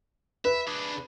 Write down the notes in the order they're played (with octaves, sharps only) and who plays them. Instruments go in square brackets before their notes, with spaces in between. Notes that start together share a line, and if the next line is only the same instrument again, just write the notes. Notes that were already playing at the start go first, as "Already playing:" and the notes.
[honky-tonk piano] B4 [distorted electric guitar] E5
[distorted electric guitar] D4 G#4